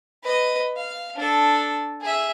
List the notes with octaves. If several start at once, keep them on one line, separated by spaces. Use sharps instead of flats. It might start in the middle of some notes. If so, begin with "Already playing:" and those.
B4 D#5
F5
D4 A4
G#4 E5